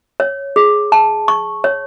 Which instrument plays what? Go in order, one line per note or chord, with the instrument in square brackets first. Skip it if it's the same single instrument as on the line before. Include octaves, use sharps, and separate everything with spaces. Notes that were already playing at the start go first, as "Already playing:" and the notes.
[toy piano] C#5
G#4
A5
C#6
C#5